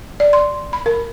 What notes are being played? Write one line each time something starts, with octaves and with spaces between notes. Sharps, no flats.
D5
C6
B5
A#4